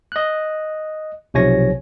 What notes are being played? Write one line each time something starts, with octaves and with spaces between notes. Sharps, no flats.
D#5 F#6
B1 C3 F3 C#5 G#5 A#6